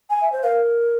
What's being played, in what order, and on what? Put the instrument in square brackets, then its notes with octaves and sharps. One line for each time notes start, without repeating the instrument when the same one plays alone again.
[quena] G#5
[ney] E5
C5
[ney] A#4 [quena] F5